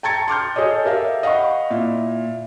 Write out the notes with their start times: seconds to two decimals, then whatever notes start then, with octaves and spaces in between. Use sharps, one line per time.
0.03 G5 A5 A#5 G#6 A6 C#7
0.28 C6 D6 F6 G6
0.56 G#4 A4 C#5 D#5
0.85 G4 A#4 E5 F5
1.23 D#5 F5 F#5 B5 C#6
1.71 A#2 E4